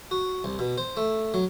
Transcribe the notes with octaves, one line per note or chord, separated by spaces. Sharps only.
F#4
C2
B2
C5
A3
F#3